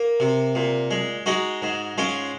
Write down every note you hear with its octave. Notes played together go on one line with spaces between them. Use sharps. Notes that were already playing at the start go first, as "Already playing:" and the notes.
Already playing: A#3
C3
A#2
G#3
G#3 D#4 F#4
G#2
G#3 C#4 F4